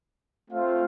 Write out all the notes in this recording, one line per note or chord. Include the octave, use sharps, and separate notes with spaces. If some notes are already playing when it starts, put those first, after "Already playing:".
A3 C4 F4 C5 F5